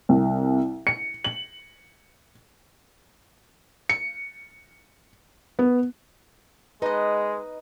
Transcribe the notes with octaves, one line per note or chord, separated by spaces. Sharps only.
C2
C#7
F#7
C#7
B3
G#3 D#4 B4 D#5